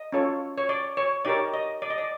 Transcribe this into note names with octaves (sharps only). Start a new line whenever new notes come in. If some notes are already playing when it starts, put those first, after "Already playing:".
Already playing: D#5
C#4 F4 A4 C#5
C#5
D5
C#5
D#4 G4 A#4 C#5 D5
D#5
D5
D#5
D5